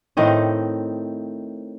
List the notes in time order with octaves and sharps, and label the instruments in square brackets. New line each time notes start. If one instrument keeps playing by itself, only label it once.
[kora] A2 D#3 C4 D#5